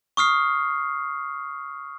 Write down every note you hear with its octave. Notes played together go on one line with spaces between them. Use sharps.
C#6 D#6 F6 C7